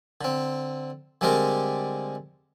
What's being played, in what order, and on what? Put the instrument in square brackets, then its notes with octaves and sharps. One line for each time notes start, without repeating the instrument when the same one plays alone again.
[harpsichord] D3 C4
D3 G3 G#3 C4 G4 A#4